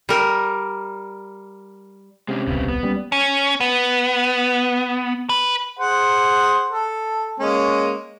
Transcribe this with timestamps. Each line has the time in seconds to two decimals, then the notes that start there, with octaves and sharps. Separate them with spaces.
0.09 G3 A#4
2.28 C3 G#3 C#4 D4
2.47 D#1 C2 C#3 B3
2.69 B3
2.83 G3 A#3 C#4
3.12 C#4
3.60 B3
5.29 B4
5.79 G#4 C5 F#5
6.72 A4
7.40 G#3 A#3 C#4